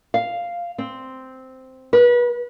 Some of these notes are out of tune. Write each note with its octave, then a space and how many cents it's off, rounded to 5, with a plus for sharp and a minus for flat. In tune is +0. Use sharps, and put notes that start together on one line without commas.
F5 -5
C4 -5
B4 -30